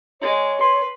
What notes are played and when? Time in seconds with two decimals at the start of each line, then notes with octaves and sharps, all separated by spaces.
0.21 G#3 C#5
0.61 B4 C6